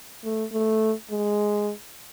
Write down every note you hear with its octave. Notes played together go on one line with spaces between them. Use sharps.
A3
A3
G#3